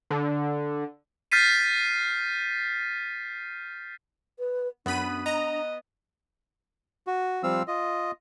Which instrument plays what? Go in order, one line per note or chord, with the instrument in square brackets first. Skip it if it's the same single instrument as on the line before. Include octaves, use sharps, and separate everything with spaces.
[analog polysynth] D3
[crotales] F6 G6 A6 B6 C7 D#7
[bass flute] B4
[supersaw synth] F#2 B5 D#7 [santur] B3 B4 [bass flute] D4
[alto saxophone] D#5 [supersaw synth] A#5
[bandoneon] F#4
F3 G3 C4 F5 E6
F4 D#5